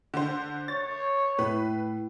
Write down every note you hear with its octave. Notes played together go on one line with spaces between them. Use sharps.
D3 C5
C#5 A6
A2 B4